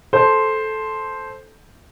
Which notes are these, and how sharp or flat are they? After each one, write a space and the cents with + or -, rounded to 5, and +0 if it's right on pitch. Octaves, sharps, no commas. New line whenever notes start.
A4 -10 C5 +0